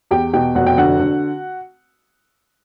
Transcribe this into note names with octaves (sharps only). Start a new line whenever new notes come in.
E2 G4 G5
B2 G4 G5
F1 F#4 F#5
G5
D3 F#4 F#5
D3